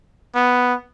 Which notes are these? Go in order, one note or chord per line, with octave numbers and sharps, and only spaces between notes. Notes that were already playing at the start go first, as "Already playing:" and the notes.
B3